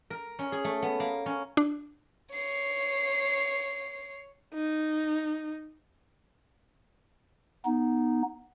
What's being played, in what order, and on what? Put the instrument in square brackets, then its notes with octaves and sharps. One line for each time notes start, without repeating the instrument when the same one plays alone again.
[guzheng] A#4
C#4
G#4
A3
B3
A#3
C#4
[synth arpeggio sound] D4
[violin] C#5 C7
[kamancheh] D#4
[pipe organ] B3 D#4